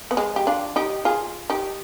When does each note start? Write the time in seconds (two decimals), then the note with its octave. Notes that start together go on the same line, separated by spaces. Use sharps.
0.11 B3
0.17 G#3
0.36 G4
0.47 D4 F4
0.76 D#4 G4
1.05 F4 G#4
1.50 D#4 G4